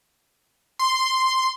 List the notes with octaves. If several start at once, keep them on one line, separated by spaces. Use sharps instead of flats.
C6